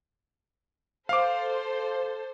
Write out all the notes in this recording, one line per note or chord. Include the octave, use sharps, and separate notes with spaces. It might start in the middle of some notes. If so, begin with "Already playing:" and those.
A4 C5 F5 D6